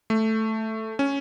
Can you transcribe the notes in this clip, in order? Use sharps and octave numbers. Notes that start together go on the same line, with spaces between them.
A3
C#4